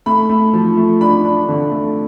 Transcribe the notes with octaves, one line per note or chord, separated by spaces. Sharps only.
A3 B5
A3
F3
A3
D4 B5
D4
D3
A3